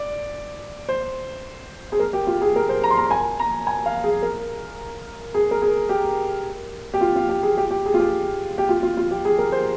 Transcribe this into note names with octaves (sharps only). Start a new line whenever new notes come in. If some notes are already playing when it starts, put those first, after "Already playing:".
Already playing: D5
C5
G#4
A#4
G4
F4
G#4
A#4
C5
A#5
C6
A#5
G#5
A#5
G#5
F5
G#4
A#4
G#4
A#4
G#4
G4
G4
F4
F4
G4
G#4
G4
G4
G#4
F4
G4
G4
F4
F4
F4
G4
G#4
A#4
C5